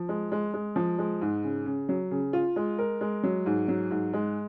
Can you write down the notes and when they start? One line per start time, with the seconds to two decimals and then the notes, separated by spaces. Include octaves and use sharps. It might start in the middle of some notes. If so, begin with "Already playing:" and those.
Already playing: F3
0.09 G#3
0.32 G#3
0.54 G#3
0.76 F3
0.99 G#3
1.22 G#2
1.44 C#3
1.66 C#3
1.89 F#3
2.11 C#3
2.33 F4
2.56 G#3
2.79 A#4
3.01 G#3
3.23 F#3
3.46 G#2
3.68 F#3
3.91 G#2
4.13 G#3